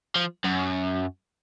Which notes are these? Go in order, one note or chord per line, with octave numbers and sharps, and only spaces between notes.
F3
F#2